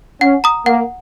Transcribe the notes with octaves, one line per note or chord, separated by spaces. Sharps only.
C#4 F#5
A#5 D#6
A#3 F#5